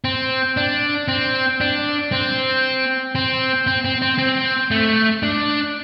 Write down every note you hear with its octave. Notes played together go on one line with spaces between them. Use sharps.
C4
D4
C4
D4
C4
C4
C4
C4
C4
C4
A3
D4